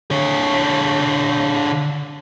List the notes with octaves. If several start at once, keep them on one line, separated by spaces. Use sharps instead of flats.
D3 C#5